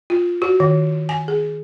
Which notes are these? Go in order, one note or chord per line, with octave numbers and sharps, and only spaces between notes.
F4
F#4
D#3
G#5
G#4